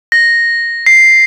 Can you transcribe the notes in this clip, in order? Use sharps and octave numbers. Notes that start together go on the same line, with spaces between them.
A#6
C7